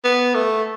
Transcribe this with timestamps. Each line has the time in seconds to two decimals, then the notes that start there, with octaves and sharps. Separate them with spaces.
0.04 B3
0.35 A3